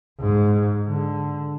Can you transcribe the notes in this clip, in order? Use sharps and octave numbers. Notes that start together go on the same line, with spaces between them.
G#2
D3